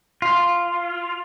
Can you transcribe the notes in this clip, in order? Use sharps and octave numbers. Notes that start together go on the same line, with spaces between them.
F4